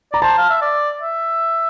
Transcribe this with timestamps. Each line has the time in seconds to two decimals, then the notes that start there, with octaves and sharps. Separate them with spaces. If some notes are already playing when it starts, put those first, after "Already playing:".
0.12 D5 A#5
0.22 C5 A5
0.38 F5
0.49 E5
0.61 D5
1.01 E5